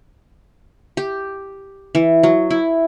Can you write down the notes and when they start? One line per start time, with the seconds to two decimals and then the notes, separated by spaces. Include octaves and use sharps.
0.97 G4
1.95 E3
2.23 F#3
2.50 E4